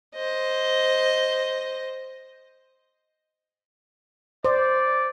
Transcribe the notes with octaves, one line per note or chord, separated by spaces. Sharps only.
C5 D#5
C5 D5